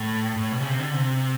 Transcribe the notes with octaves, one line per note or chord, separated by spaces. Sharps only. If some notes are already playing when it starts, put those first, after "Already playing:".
Already playing: A2
A2
B2
C#3
C3
D3
C3